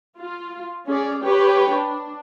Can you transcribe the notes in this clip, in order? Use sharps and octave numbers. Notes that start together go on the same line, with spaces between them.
F4
C#4 G#4 D5
G4 B4 C#5 G5
D4